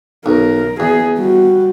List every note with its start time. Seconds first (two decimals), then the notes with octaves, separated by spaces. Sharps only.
0.26 B1 A#4
0.80 E2 G#4
1.18 G3 F#4